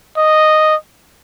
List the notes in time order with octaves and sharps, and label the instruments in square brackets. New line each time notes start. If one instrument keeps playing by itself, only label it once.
[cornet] D#5